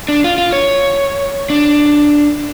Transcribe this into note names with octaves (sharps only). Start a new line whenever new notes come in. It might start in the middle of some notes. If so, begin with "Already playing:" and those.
D4
F4
F4
C#5
D4